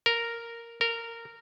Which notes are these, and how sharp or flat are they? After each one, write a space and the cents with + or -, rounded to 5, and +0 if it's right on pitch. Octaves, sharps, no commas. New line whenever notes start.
A#4 -5
A#4 -15